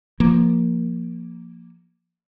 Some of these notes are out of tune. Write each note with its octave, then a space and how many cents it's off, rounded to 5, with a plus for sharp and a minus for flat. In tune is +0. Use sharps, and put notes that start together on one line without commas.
F3 -5 A#3 +0